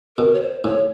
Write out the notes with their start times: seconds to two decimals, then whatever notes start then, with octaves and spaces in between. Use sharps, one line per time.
0.17 B2 A#4
0.34 C#5
0.41 C5
0.64 A2 C#5